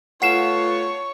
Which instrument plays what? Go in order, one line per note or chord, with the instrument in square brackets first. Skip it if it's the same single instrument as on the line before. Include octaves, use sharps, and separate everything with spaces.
[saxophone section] A3 B3 F4 [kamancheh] C#5 [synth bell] F#5 C7 E7